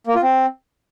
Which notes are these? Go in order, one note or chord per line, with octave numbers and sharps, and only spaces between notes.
A#3
F4
C4